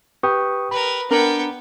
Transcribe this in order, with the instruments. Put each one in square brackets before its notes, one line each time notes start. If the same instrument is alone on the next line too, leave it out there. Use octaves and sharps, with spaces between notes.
[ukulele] G4 [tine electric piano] B4 C#6 D#6
[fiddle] A#4 B4 [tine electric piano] B5
[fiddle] B3 G5 [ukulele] D4 A#4